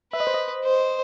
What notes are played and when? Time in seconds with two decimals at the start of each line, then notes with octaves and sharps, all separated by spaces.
0.13 B4 E5
0.20 D#5
0.27 C5
0.34 D#5
0.65 C5